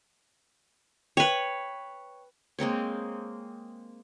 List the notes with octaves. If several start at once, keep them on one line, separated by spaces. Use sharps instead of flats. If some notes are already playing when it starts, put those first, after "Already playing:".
B4 C#5 G5
G#3 A#3 C4 C#5